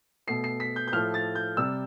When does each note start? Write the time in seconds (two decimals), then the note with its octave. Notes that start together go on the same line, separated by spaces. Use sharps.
0.27 B2 A3 C7
0.44 C7
0.60 B6
0.76 G6
0.88 G6
0.92 A2 F3 A3 F6
1.14 A6
1.35 G6
1.57 C3 G3 E6